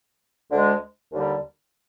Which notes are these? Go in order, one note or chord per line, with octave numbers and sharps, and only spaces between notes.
D2 D3 G#3
D#2 D3 G3